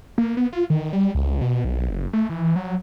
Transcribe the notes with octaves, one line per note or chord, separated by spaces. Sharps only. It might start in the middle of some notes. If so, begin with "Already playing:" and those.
A#3
B3
F4
D#3
G3
C#2
B2
B1
F#1
A3
E3
F#3